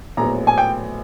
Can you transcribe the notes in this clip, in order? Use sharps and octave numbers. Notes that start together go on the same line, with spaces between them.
A#1 A2 F#3 B3 A#5
G#5
G5